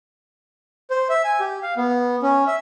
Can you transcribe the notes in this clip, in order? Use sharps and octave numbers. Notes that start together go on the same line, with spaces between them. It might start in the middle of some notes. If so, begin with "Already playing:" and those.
C5
E5
G#5
G4
F5
B3
C#4
E5